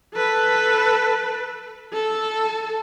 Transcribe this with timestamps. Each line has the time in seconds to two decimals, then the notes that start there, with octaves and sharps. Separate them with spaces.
0.15 A4 B4
1.93 A4